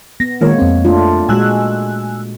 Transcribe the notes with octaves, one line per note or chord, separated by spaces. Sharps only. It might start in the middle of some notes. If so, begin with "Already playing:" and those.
B3 A#6
D#3 G#3 A#3 F4 A#4 C#5
F2 C4
A3 D4 F4
A#2 G#3 F#4 G#5 E6 F#6